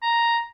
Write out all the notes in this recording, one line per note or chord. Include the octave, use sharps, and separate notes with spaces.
A#5